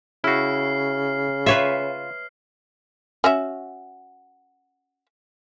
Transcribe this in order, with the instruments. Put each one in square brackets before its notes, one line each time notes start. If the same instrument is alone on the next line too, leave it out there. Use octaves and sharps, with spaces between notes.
[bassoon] C#3 [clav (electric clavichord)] E4 F#4 [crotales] F6 C7
[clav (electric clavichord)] F4 [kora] B4 C#5 E5
[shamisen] C#4 F#4 E5